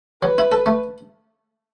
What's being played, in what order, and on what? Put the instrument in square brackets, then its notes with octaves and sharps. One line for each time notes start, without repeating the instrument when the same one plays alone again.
[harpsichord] F#3 [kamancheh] B4
[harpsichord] E4
A4
A3